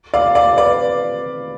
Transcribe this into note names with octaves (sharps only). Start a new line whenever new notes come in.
D5 F5
D5 F5
B4 D5